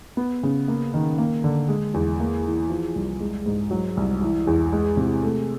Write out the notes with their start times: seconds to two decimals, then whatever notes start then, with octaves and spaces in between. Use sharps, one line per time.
0.17 B3
0.43 C#3
0.68 A#3
0.94 D#3
1.18 A#3
1.44 D3
1.69 G#3
1.94 E2
2.20 A#3
2.45 E3
2.70 F3
2.96 C2
3.20 G#3
3.46 G#2
3.71 F#3
3.97 C2
4.22 E3
4.47 E2
4.73 G#3
4.97 C3
5.23 A3